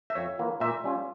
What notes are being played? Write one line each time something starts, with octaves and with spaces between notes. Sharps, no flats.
E5
F2 C#5
E3 A#3 F4
A#2 E5
G3 C#4 F4